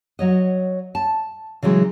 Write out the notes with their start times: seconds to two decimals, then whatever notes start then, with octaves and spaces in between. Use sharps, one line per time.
0.19 F#3 C#5 D#5
0.95 A5
1.63 C#3 E3 F#3 G#3